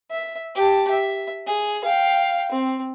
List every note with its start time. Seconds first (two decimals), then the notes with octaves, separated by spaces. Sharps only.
0.11 E5
0.56 G4 A5
0.91 E5
1.47 G#4
1.84 F5 G5
2.52 C4